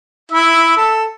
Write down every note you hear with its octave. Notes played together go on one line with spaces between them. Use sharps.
E4 E5
A4